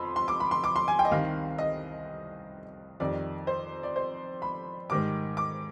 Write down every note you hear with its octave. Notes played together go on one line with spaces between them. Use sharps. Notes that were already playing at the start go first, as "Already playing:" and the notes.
Already playing: F2 B5 C6
C6
D6
B5
C6
D6
C6
G#5
G5
D#5
C2 C3 D#3 G3 F5
D#5
F2 D#3 G3 D5
C5
D5
C5
B5
G#2 D#3 G3 D6
D6